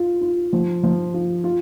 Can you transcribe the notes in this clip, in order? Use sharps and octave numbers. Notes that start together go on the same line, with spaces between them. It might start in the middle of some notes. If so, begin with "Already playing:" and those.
Already playing: F4
F4
F3
F3
F4
F4